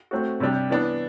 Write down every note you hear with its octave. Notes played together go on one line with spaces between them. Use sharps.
A3 C4 F#4
C3 G3 D4 G4
E3 B3 D4